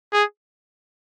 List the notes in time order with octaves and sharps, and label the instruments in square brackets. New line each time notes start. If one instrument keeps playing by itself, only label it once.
[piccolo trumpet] G#4